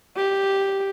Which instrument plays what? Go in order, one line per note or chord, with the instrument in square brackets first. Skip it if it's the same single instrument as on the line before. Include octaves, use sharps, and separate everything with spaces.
[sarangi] G4